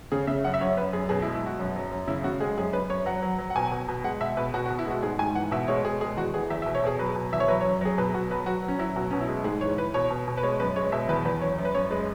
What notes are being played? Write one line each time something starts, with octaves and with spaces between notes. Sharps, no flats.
C#3 G#4
C#3 E5
F#2 F#5
E5
F#2 C#5
F#2 B4
F#2 G#4
B2 G#4
E4
G#3
E4
B2 F#4
F#2
F#3
F#2
C#3 E4
C#3 F#4
G#3 G#4
F#2 G#4
F#2 B4
F#2 C#5
F#3 F#5
F#3
F#3
F#5
B2 G#5
B2
B2
G#3 F#5
B2 E5
B2 B4
B2 F#4
F#4
B2
E4
G#3 F#4
G#2 G#4
G#2 G#5
E3 F#5
B2 E5
G#3 C#5
B2 G#4
G#3 G#4
E2 F#4
E3 G#4
E2 E5
E5
B2
C#5
B2 G#4
F#3 B4
B2
E2 E5
C#5
F#3 B4
C#5
F#2
F#3 G#4
B2 B4
B2 F#4
F#3 B4
F#3 F#4
F#3
C#4
F#3 E4
B2 F#4
B2 C#4
E4
G#3
G#2 G#4
E3 C#5
E3 B4
B2 C#5
B2
B2
B4
G#3 C#5
F#2 B4
G#3 C#5
B2 E5
E2 B4
E2 B4
F#2 C#5
F#2
B4
F#2 C#5
G#3 B4